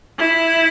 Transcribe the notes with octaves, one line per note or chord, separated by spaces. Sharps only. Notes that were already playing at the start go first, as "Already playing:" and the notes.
E4